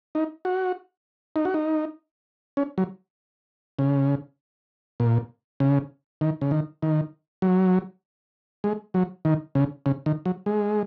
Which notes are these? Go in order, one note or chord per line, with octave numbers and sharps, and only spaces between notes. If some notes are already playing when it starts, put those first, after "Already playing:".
D#4
F#4
D#4
F#4
D#4
C#4
F#3
C#3
A#2
C#3
D#3
C#3
D#3
D#3
F#3
G#3
F#3
D#3
C#3
C#3
D#3
F#3
G#3